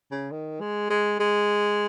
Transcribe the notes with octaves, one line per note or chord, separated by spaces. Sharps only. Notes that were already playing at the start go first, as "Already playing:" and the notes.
C#3
D#3
G#3
G#3
G#3